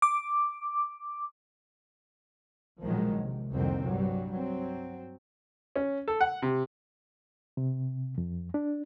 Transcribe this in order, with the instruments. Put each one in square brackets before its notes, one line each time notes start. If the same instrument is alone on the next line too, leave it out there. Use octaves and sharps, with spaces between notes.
[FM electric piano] D6
[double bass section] A#1 B2 D#3 F3 F#3 G#3
C3
C2 F2 A#2 D3 D#3 C4
G2 F#3 G3
F#3 C4
[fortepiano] C#4
A4
F#5
C3
[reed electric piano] C3
F2
D4